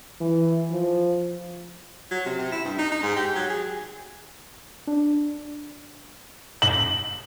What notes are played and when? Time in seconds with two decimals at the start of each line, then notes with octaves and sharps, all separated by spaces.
0.20 E3
0.70 F3
2.11 F#3
2.26 C3
2.39 C3
2.52 E4
2.65 G2
2.79 D#4
2.92 D#4
3.03 G#2
3.16 G4
3.36 F#3
3.50 G#4
4.87 D4
6.62 F#7